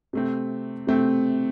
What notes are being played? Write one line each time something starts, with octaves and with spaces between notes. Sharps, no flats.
C3 A3 C4
C3 A3 C4